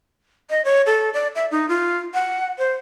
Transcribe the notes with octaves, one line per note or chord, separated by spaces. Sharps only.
D#5
C#5
A4
D5
E5
D#4
F4
F#5
C5